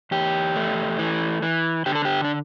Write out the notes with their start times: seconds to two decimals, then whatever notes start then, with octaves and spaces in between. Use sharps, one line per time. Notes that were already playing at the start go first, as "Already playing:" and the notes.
0.11 E2 G4
0.56 A3
0.99 E3
1.42 E3
1.86 D3 G4
1.95 A4
2.05 G4
2.24 D4